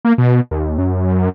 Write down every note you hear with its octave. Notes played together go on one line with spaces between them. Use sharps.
A#3
B2
D#2
F#2